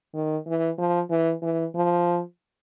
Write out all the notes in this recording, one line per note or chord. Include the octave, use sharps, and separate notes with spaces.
D#3
E3
F3
E3
E3
F3